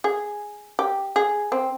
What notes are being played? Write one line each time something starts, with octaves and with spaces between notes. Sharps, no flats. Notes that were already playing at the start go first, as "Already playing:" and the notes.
G#4
G4
G#4
C4